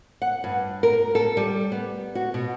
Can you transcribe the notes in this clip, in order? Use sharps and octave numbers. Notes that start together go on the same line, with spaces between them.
F#5
G2
A#4
A4
G3
B3
F#4
B2